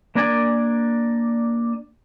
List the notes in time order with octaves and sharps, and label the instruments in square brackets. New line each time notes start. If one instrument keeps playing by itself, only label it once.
[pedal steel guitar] A#3 D4 A#4 D5 G#5